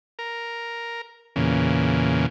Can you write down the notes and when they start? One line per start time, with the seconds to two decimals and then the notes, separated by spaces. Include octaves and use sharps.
0.19 A#4
1.36 E2 A#2 C#3